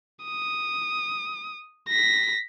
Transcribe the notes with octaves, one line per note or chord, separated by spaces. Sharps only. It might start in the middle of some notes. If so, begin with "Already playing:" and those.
D#6
A#6 B6